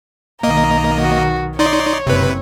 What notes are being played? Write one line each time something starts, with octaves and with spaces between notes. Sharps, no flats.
B1 D#3 A#3 D#5 A#5
F#4
D#4 C#5 D5 C6
F#1 C3 C4 B4